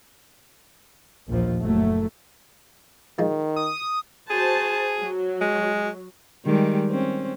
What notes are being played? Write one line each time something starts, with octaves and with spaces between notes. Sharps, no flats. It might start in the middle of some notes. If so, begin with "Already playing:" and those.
A#1 D#2 F3
F#1 F#3 A3
D#3 F3 G#3
D#6
F#4 G#4 C5 A5
F#3
G#3
D#3 G3 G#3
C4 C#4